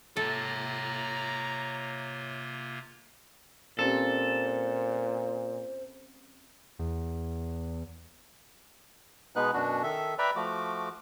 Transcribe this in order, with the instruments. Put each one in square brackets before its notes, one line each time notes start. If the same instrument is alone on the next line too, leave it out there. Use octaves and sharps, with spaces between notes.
[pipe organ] C3 A#3 F4 [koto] A4 [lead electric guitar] C#5 E5 [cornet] A#5
[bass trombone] A#2 [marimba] C4 C#4 G4 [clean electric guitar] A4 [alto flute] C5
[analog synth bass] E2
[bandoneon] B2 G#3 B3 D#4 B4 F#6
F#2 B2 D4 F#4
D#3 A4 E5
B4 D5 E5 G5 A#5 B5
F3 A3 F#4 D6